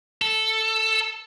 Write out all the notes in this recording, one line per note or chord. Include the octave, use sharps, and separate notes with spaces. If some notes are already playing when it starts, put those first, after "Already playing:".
A4